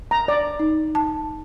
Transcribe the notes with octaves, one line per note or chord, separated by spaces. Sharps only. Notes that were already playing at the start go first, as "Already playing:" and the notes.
A#5
D5
D#4
A5